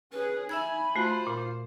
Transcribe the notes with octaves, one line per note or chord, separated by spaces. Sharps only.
C#4 G#4 B4
D#4 E5 G#5 B5 E6 G#6
A3 F4 F#4 C5
A#2